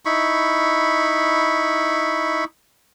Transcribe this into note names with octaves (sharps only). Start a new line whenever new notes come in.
D#4 E4 B5 C#6